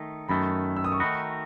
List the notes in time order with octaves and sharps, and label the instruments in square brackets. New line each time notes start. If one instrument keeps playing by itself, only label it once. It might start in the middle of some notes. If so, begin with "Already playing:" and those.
Already playing: [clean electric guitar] D#3 A3 D#4
[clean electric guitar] F#2 D#3 A3 [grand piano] B5
[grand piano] E6
D#6
C#6
[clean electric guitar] D#3 A3 D#4 F#4 [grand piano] B5